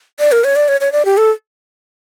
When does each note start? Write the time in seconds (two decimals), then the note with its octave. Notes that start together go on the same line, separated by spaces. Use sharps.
0.19 D5
0.32 A#4
0.44 C#5
0.56 D5
0.68 C#5
0.81 C#5
0.92 D5
1.05 G4
1.17 A4